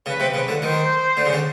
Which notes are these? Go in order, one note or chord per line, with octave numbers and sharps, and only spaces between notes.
C#3 B4
C3
C#3 B4
D3
D#3 C5
D3
C#3
D3